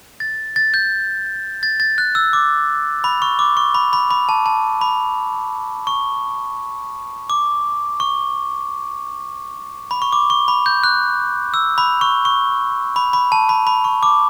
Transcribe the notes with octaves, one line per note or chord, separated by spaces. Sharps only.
A6
A6
G6
A6
A6
F#6
E6
D6
B5
C#6
D6
C#6
B5
B5
B5
A5
A5
B5
C#6
D6
C#6
B5
C#6
D6
C#6
B5
G6
F#6
E6
B5
C#6
C#6
B5
B5
A5
B5
B5
C#6
D6